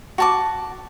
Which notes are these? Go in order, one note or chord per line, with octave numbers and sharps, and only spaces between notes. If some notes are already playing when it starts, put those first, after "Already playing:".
F#4 A5 D6